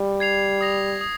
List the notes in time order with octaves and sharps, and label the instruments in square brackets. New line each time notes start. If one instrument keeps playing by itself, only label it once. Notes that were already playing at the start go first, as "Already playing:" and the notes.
Already playing: [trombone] G3
[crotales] G#6 C7 F7
D#6 A#6 F7
D#6